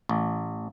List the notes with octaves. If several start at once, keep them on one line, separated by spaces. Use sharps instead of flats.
A1